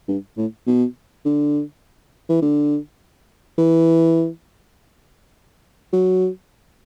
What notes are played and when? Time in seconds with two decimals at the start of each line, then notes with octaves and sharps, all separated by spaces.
0.08 G2
0.37 A2
0.67 B2
1.25 D3
2.29 E3
2.42 D3
3.58 E3
5.93 F#3